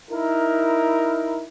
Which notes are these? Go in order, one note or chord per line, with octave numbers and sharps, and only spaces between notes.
D#4 E4 A#4